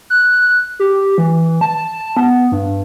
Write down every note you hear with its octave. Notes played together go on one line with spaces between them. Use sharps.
F#6
G4
E3
A5
B3
G2